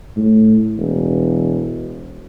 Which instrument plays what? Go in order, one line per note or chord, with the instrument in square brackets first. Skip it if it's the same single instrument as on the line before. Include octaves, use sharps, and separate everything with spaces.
[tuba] A2
E1